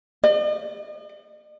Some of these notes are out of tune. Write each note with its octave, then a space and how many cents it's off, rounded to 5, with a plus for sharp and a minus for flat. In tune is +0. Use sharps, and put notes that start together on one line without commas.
D#5 -45